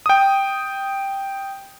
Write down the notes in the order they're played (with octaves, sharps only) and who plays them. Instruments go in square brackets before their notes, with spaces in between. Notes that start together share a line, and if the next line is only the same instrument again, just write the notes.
[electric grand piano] G5 D#6